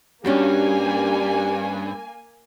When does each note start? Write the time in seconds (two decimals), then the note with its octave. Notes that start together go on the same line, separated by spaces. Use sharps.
0.25 G2 A#3 C#4 D4 F#4 G4 G#5